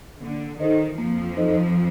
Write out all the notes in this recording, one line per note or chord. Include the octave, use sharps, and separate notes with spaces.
D3 A#3
D#3 D#4 A4 C5 D#5
F2 F3 A#3
D#4 A4 C5 D#5